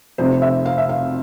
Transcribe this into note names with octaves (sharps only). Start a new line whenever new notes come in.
F1 F2 C3 C5
E5
F5
E5
F5